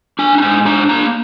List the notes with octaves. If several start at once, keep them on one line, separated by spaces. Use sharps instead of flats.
D4 G#5
A#5
G#2 G#5
D4 A#5
A#3 A#5